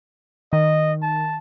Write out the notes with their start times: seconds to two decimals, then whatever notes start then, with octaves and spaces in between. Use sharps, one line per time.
0.53 D#3 D#5
1.02 A5